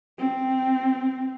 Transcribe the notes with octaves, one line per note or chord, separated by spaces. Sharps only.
C4